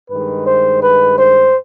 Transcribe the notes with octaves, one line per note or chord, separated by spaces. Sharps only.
G2 D#3 G#3 B4
C5
B4
C5